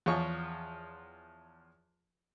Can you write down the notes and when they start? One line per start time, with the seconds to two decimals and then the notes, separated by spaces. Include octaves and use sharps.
0.06 E2 F3 F4 C#5 C#6